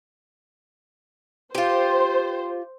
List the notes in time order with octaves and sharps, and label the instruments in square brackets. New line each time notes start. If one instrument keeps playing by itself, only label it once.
[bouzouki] F4 G4 [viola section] C5